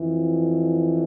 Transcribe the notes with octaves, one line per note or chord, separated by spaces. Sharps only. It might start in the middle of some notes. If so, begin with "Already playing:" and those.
Already playing: F2 E3